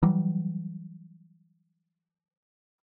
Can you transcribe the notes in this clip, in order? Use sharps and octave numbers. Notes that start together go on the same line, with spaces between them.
E3 F#3 G3